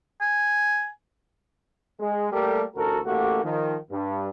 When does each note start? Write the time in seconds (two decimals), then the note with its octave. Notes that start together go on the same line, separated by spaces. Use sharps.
0.21 G#5
2.00 G#3
2.32 G3 A3 A#3 G4 A4 A#4
2.76 A1 D2 F#4 A4 A#4
3.06 A1 A3 A#3 F#4 G4
3.43 D#3 F3
3.91 G2